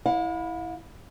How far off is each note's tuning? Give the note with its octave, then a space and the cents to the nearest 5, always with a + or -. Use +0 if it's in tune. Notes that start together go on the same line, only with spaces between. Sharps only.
E4 -5 F5 +45